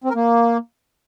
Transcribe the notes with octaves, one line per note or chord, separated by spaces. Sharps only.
C4
A#4
A#3